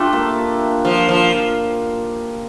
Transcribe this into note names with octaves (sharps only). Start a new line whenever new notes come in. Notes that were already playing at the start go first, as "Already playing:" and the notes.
Already playing: A3 D4 F4 G4
A#3
F3
F3